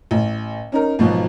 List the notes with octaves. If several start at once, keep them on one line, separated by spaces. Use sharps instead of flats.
A1
C#4 D#4 A#4
G#1 B2 F3 F#3